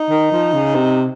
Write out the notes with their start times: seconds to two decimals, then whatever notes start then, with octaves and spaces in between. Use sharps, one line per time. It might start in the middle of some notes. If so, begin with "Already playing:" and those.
Already playing: D#4
0.10 D#3
0.32 F3
0.54 C#3
0.75 C3